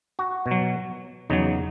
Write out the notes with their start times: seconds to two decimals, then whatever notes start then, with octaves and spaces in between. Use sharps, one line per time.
0.19 F#4
0.46 B2
0.51 F#3
1.30 E2 C#3 F#3 D#4